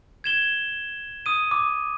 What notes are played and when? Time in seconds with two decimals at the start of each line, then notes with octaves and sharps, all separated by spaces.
0.24 G#6 E7 G7
1.26 D#6 D#7
1.51 D6